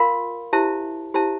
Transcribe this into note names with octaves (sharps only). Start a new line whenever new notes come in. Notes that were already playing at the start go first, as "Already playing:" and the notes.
Already playing: F4 A#4 F5 C6
E4 G4 C5 E5 A5
E4 G4 C5 E5 A5